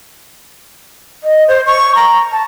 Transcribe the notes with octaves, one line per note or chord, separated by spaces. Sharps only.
D#5
C5
C#6
A#5
A5